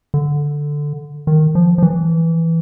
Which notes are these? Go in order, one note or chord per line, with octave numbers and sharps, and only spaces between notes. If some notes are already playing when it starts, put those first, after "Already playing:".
D3
D#3
F3
F3
E3